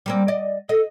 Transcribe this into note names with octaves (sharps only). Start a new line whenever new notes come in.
G3 A#3 C4
D5 D#5
A4 D#5